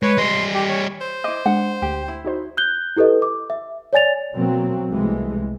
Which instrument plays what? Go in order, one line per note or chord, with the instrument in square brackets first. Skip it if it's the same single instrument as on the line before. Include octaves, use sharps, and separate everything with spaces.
[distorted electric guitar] G#3 [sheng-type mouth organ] B4 C#5
[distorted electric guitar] G3 D#5 [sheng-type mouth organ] C6
[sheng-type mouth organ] G4
C#5
[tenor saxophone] C5
[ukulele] E4 D#5 [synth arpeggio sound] D6
[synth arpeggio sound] G#3 D4 [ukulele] F#5
[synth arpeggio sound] D2 [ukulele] G4
[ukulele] E4
[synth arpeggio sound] D#4 F#4 C5
[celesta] F#6 G6 G7
E4 G4 A4 B4 D#5
D6
E5
C#5 D5 G#5 A6 F7
[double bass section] B2 F#3 A#3 C4
C2 E3 G#3 A3